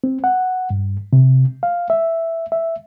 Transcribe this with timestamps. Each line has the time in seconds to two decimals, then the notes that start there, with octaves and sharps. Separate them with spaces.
0.04 C4
0.24 F#5
0.70 G2
1.13 C3
1.63 F5
1.90 E5
2.52 E5